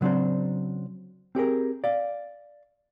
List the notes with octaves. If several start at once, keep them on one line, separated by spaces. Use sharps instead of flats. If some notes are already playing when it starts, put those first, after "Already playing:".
C#3 F#3 C4 D4 C5
C4 G4 G#4 A#4
D5 F5